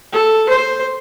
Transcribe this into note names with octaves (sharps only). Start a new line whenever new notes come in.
A4
C5